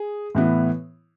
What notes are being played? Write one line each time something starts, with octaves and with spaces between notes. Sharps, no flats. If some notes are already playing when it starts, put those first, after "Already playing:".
Already playing: G#4
A2 E3 B3 E4